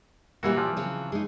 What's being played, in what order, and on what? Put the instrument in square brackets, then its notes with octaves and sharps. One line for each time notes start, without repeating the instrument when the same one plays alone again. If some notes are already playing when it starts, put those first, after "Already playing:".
[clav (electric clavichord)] F#2 E3 F#4 [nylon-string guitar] A#2 G3 A#3
[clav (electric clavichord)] E3 F3
[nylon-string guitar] C#3 F#3 C4
G#3 D#4